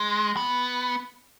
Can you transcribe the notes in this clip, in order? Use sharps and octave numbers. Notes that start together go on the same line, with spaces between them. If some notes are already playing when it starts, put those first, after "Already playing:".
Already playing: G#3
B3